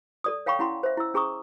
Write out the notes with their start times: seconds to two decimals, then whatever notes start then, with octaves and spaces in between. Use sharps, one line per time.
0.24 A4 D5 D#6
0.46 C#5 F5 G5 B5 C#6
0.59 C#4 E4 F#5 B5 C6
0.83 C5 E5
0.97 E4 E6
1.14 C#4 G#4 A#5 C#6 D#6